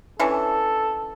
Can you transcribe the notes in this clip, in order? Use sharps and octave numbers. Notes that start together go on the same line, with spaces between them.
E3 C#4 D4 A4